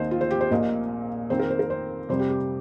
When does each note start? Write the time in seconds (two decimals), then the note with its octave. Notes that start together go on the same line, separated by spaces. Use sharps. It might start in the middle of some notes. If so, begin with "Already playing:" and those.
Already playing: D#2 D#3 C4 C5 D#5
0.11 F4
0.21 C5
0.31 G4
0.41 C5
0.51 A#1 A#2 A#3 D#5
1.30 F2 D#3 C4 C5
1.39 A#4
1.50 C5
1.59 A#4
1.70 C5
2.09 F2 C3 G3 C5
2.19 G4
2.30 G4